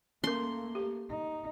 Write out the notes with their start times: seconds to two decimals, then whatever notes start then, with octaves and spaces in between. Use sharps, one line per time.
0.24 A3 A#3 C#4 A#4 C6
0.75 G4
1.09 D#4